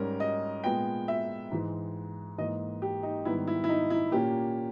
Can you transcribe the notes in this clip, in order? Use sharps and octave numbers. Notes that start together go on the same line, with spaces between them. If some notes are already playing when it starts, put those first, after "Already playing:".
Already playing: G#2 G3 C#4 A#4
D#5
A#2 G#3 B3 G5
E5
G#2 E3 G#3
G#2 E3 A#3 D#5
G4
D#4
G#2 D#3 G3 B3 E4
E4
E4
D#4
E4
A#2 A#3 C#4 G4